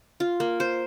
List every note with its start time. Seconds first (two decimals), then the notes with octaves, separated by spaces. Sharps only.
0.20 F4
0.40 A#3
0.60 C5